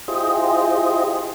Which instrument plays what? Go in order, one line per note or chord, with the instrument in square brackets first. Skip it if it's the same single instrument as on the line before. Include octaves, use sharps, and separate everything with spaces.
[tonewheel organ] E4 F4 G4 G#4 C5 D#5